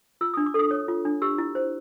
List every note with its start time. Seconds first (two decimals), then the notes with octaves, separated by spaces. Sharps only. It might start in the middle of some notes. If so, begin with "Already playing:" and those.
0.21 F4 E6
0.34 D4 D#6
0.46 D6
0.54 A4
0.59 D#6
0.71 C#5
0.88 F4
1.05 D4
1.22 G4 E6
1.38 E4
1.55 C5